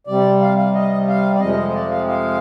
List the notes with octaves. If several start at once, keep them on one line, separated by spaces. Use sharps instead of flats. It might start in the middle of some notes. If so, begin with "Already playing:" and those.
C3 G3 D5
F5
F5
D#5
F5
D5
F2 C3 F3 G#3 D#5
C5
D5
F5
F5